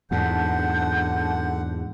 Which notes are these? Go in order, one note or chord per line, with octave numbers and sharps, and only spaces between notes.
E2 G#2 D3 F#5 A5 G6